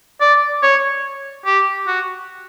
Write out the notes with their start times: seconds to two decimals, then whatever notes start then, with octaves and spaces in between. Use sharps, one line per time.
0.21 D5
0.63 C#5
1.46 G4
1.87 F#4